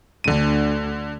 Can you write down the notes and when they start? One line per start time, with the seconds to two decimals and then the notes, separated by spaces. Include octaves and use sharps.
0.24 D2 D3 D#7